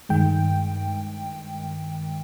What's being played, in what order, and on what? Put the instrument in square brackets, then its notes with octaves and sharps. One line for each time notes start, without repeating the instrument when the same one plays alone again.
[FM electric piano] G2 D#3 G#3 G5